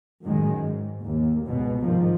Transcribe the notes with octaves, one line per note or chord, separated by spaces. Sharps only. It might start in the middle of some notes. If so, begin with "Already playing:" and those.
F#2 A2 D#3 G#3
G#2
D#2
C#2 G#2 B2
C2 G#2 D#3 F3